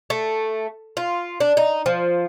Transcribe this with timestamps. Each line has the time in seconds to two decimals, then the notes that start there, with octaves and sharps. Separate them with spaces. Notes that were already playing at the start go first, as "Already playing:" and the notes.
0.10 A3
0.97 F4
1.40 D4
1.57 D#4
1.86 F3